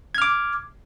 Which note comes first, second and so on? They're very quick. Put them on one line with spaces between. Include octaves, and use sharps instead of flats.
G#6 F6 D6